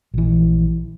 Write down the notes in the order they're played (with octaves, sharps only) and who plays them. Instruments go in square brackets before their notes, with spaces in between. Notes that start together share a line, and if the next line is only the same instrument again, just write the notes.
[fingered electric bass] A#1 E3